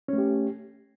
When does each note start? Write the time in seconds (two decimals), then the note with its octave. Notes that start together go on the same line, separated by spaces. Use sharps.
0.08 C#4
0.13 A3
0.18 G4